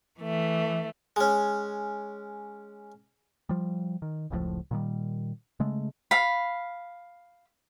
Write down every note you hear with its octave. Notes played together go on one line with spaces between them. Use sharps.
E3 A3
G#3 C#4
F3 G3
D#3
F1 C#2 A2 F3
A#2 D#3 G3
C#3 G#3 A3
F5 B5